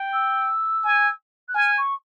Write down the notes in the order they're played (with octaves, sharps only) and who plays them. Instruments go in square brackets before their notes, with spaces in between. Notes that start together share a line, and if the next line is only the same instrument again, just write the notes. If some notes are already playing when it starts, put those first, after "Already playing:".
Already playing: [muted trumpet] G5
[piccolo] E6
[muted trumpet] G#5
[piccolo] F#6
[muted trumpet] G#5 [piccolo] F6
[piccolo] C#6